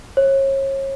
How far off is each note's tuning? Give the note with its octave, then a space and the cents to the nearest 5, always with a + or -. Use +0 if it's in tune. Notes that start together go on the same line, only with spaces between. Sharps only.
C#5 -35